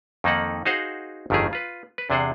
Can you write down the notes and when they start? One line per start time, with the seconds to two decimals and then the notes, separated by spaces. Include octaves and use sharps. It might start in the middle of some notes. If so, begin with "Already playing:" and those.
0.24 F2 D#3 A#3 D#4 A4 F#5
0.65 D#4 F#4 G#4 C5 F5 F#5
1.30 G1 F2 D#3 A3 G4 G#4
1.53 F4 B4
1.98 B4
2.10 E2 C3 D4 G#4 C5 F#5